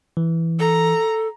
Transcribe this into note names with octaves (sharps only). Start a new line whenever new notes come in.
E3
A4 A#5